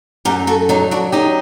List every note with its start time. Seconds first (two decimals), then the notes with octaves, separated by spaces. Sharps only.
0.25 F#2 G4 A#4
0.47 F#4 A4
0.69 F#3 D#4 G4
0.91 D4 F#4
1.12 F#3 D#4 G4